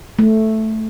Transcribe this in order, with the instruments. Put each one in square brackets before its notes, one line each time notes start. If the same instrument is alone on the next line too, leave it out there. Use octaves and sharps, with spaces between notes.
[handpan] A3